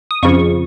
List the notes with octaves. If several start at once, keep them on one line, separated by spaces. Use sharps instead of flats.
D#6
F2 C#3 F3 C#6